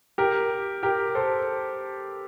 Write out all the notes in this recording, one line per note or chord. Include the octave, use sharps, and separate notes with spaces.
G4 A#4
G4 A#4
A4 C5